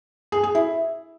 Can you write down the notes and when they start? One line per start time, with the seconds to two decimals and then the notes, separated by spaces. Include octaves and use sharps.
0.32 G#4
0.44 G#4
0.55 E4